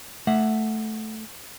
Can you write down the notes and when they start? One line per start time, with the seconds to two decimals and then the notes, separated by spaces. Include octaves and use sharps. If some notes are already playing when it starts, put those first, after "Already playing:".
0.27 A3 E5 F#5